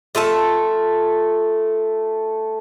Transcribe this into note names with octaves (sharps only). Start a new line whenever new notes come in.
A3 F4 A4 A5